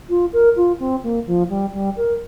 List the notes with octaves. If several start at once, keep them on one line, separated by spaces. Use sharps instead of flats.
F4
A#4
F4
C4
A#3
F3
G3
G3
A#4